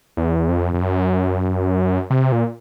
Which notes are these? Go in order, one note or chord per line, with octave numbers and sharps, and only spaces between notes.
E2
F2
F2
F#2
C3
A#2